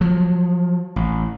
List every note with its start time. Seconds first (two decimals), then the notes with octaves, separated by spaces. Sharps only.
0.01 F3 F#3
0.96 A1